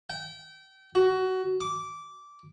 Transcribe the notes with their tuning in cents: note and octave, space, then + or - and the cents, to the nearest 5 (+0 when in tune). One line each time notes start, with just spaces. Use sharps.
G5 -30
F#4 +20
D6 -15